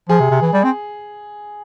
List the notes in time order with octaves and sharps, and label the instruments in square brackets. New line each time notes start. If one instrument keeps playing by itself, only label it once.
[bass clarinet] F3 [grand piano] G#4
[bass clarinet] C3
C3
E3
G3
C4